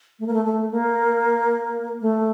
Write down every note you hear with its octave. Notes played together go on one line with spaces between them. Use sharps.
A3
A#3
A3
A3
A#3
A3